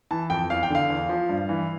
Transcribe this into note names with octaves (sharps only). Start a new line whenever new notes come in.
E3 A5
F2 G5
E2 F5
G5
D3 F5
E2
F3
G2
E3